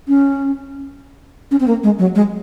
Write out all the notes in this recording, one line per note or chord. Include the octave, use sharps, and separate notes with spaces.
C#4
C#4
C4
A#3
G#3
F#3
G#3